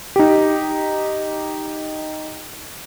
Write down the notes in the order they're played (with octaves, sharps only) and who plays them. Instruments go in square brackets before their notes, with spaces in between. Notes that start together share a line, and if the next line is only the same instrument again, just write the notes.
[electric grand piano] D#4 G4